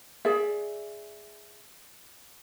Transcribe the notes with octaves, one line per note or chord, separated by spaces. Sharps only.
G#4 D5 E5